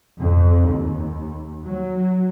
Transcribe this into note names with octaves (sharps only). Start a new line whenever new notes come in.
F2
D#2
F#3